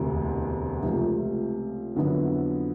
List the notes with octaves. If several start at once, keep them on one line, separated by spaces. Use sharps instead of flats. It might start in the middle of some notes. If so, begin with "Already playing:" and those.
Already playing: E1 D2 C3 E3
C#2 C3 F3 A3
F2 D3 F#3 B3 E4